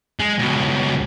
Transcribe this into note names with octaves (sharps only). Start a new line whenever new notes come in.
G#3
C#2 B2